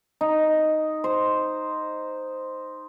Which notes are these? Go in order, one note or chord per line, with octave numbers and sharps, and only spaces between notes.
D#4
C5